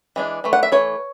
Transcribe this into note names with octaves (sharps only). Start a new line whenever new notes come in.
E3 G#3 D4
E3 A3
F#5
E5
E3 A3 C#5